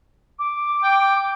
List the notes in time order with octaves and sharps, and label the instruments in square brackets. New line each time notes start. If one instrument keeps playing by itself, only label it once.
[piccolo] D6
[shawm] G5